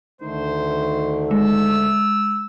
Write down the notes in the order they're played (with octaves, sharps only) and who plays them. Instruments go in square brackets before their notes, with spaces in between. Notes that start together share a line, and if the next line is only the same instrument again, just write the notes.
[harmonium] D2 D3 A3 [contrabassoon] D#3 [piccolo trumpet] C5
[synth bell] G#3 [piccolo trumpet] E6